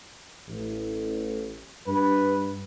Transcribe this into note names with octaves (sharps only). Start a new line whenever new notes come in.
A1
G2 B4